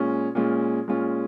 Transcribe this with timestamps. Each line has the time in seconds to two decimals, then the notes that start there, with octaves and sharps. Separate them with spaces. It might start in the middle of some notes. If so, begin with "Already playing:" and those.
Already playing: A#2 G#3 C#4 F4
0.35 A#2 G#3 C#4 F4
0.88 A#2 G#3 C#4 F4